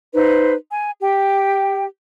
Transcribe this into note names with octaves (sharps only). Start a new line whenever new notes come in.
D#4 B4 C5
G#5
G4 G5